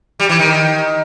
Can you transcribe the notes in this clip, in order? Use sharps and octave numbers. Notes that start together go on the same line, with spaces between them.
G3
E3
D#3